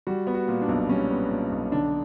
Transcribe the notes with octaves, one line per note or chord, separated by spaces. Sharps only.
G3 F#4
B3
F#4
A#2
D4
B1
G3 C#4
B3
A#2
B1
D3 D4